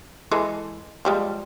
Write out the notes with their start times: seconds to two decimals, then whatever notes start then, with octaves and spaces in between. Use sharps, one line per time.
0.31 E3 G#3 A4
1.05 F3 G3 G#3